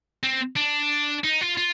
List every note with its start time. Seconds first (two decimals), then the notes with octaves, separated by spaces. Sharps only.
0.23 C4
0.56 D4
1.24 D#4
1.41 F4
1.57 F4